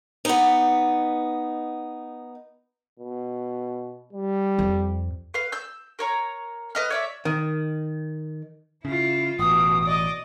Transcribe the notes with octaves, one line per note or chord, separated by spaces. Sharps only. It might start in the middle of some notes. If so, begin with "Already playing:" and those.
B3 D#4
B2
G3
F2
B4 F5
E6 G6
A#4 C#5 A#5
B4 D#5 F6
C#5 D5 E5
D#3
C#3 E4 F4
A1 B2 D#6
D5 D#5